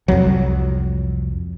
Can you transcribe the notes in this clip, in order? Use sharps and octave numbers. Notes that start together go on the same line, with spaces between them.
C2 F2 F#3